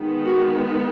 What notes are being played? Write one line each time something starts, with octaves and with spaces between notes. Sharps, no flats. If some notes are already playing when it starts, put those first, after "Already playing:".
Already playing: D#3 G#3 B3
F#4